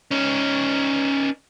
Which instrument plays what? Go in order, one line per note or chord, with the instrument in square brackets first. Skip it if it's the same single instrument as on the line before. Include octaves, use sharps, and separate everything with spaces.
[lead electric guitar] C#4 D#4